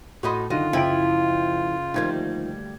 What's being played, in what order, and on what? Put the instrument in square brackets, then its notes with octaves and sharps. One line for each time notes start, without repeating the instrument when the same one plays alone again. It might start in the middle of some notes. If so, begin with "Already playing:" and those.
[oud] A2 D#4 D#5 [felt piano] F#4 B5 C6
[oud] F#2 F#4 D#5 [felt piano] D3 D#3 [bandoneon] F4
[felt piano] F#1 G5 D7 [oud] F3 E4
[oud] D2 G3 A#3 [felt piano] D#3 F3 G#6